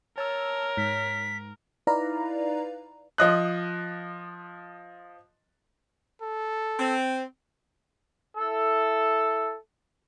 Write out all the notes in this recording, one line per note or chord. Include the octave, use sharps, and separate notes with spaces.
A#4 C#5 A5 E6
G#2 B6
D#4 E4 B4 D5 F5 A#5
F3 D#5 F#6
A4
C4
E4 A4